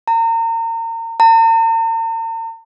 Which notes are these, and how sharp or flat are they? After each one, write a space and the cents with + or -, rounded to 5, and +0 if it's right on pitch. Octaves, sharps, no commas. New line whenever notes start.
A#5 -35
A#5 -45